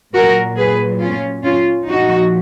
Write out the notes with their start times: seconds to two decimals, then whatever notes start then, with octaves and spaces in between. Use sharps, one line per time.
0.14 A#2 F#3 F#4 A#4
0.57 G#4 B4
1.01 C#4 F4
1.44 C#4 F4
1.87 A#2 F3 D#4 F#4